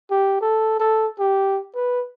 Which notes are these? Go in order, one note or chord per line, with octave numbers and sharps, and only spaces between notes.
G4
A4
A4
G4
B4